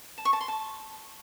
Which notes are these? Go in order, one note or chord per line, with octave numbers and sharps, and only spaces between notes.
A5
C#6
A5
C6
A5